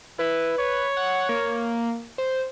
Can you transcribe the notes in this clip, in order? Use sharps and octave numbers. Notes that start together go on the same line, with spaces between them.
E4 B4
C#5
F#5
A#3
C5